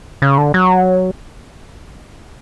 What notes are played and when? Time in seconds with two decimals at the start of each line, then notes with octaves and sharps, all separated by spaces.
0.22 C#3
0.38 D3
0.54 F#3